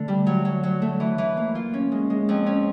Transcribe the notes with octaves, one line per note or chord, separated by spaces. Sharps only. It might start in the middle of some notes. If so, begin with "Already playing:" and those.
Already playing: D3 A3
G3
F#3
F#3
F#3
A3
E3
E3
A#3
F4
C#4
G#3
G#3
F2
C#4